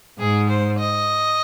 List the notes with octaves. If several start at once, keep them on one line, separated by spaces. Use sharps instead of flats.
G#2 G#4
C5
D#5